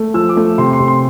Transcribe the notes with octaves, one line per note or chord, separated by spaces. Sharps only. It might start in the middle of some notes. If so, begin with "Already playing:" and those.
Already playing: A3
F3 E6
D6
A3
C3 C6
C6
C3
C6